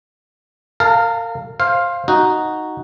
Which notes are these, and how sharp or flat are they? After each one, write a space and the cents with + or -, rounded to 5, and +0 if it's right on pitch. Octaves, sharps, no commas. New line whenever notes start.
A#4 -35 F5 +0 A5 +0
C5 +20 F5 +0
D#4 +0 F#4 +0